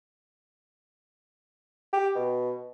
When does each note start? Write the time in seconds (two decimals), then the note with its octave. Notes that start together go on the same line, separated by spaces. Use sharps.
1.93 G4
2.15 B2